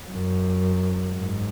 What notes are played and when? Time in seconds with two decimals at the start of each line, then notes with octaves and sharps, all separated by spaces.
0.11 F#2
1.12 G#2